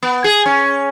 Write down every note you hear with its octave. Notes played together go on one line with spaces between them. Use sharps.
B3
G#4
C#4